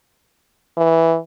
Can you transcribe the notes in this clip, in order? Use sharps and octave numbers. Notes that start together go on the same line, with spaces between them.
E3